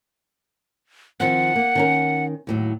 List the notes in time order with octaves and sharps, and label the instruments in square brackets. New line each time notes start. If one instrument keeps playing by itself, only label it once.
[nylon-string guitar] D#3 F3 C4 [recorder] F#5
[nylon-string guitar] A#3
D#3 C#4 A#4
D#2 A2 F#3